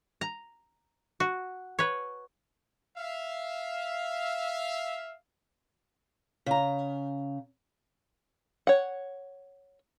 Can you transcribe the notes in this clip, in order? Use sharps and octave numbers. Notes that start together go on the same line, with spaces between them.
A#5
F#4
B4 C#5
E5 F5
C#3 A#5
C#5 F#5